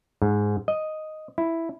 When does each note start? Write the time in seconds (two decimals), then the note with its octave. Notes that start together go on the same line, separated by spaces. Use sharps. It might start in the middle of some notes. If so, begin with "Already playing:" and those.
0.22 G#2
0.68 D#5
1.38 E4